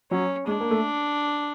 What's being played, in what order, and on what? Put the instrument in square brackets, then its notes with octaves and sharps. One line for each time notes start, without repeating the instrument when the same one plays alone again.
[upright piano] F#3 [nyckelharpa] C#4
[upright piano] G#3 [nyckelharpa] D4
[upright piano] A#3
A3